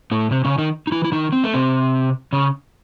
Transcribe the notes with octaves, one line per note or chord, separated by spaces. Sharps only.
A2 A3
C3 C4
C#3 C#4
D#3 D#4
D#4
E3 E4
E4
D#3 D#4
C4
A3
C3 C4
C#3 C#4